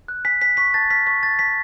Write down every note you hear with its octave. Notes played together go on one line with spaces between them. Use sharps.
F#6
G#5 B6
G#5 B6
C#6 B6
A5 A6
F6 B6
C#6 B6
A5 A6
A5 B6